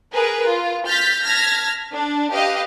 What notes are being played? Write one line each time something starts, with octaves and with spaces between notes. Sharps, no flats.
G#4 A#4 B4
F4
F6 G6 A6 B6
A5 F6 G#6 A#6 B6
D4
G4 B4 D#5 F5